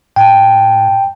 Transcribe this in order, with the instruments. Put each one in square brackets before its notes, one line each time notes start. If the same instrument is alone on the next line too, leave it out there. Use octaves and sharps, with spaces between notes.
[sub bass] A2 [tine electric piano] G5 A5